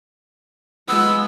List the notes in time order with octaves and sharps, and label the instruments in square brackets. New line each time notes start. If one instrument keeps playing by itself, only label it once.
[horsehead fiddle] G#3 F4 [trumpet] B3 [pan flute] E6